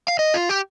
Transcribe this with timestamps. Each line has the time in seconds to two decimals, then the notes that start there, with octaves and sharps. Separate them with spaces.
0.08 F5
0.19 D#5
0.34 F4
0.49 G4